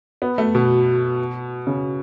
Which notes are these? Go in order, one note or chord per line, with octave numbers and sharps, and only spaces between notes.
B3
A3
B2
C#3